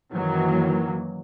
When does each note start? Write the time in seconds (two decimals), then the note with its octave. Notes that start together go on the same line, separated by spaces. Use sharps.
0.12 F#2 D#3 E3 F#3 A#3